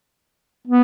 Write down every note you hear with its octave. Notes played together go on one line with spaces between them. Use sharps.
B3